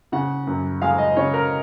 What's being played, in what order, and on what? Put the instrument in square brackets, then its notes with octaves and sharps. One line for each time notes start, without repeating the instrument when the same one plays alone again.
[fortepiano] C#3 F#5
F#2
G#3 F5
D#5
C#3 C#5
A#4